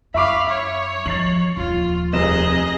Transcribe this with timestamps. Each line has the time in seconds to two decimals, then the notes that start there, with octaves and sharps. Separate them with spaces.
0.14 F#2 E5 F5 B5 C#6 D6
0.49 C#5
1.06 F3 A6 C7 F#7
1.56 D#1 F3 F4
2.13 F1 C2 G#4 D#5 E7